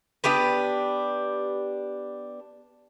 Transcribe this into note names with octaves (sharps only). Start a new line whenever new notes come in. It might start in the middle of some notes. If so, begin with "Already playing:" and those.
B3 D4 G4 B4